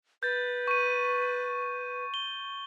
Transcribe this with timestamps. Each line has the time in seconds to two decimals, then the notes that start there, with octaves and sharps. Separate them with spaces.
0.23 B4 G6 A6
0.68 C#6 D#7
2.14 G7